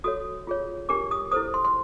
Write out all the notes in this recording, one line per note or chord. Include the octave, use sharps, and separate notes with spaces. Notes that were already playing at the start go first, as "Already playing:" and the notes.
F#4 A4 C#5 D#6
F4 G#4 C#5
D4 G4 A#4 D6
D#6
E4 A4 C5 D#6
C6
C6